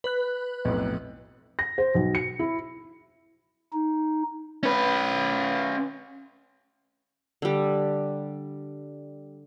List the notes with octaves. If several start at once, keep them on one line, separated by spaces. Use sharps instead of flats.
B4 F#6
B1 F2 A2
A#6
C5
B1
C#7
E4
D#4
C#4 B4
D3 G3